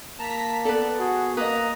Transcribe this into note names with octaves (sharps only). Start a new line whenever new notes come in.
A#3 A5 A#5 B6
B3 A4 B4 D5
F#4 G#4
A#3 B4 D#5 A#5 D#6